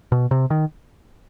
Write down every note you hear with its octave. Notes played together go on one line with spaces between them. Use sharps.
B2
C3
D#3